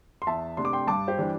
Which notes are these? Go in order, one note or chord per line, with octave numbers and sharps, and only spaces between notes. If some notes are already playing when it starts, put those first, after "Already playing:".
C6
E2 E5 A5
C3 A3 D4 C6
D6
G5 C6
G2 A5 D6
G4 C5
E3 G3 D4